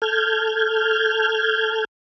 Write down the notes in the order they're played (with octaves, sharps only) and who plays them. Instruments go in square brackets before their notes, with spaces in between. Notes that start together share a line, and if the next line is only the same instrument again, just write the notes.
[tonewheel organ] A4 F6 G6 G#6